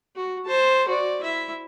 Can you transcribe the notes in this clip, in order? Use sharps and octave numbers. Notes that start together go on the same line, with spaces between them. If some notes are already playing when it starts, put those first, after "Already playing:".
F#4
C5 A5
F#4 D5
E4 E5